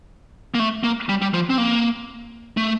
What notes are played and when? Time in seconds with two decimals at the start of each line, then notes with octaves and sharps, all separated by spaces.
0.55 A#3
0.60 A3
0.84 A#3
1.09 G3
1.22 G3
1.34 F3
1.50 C4
1.58 A#3
2.57 A3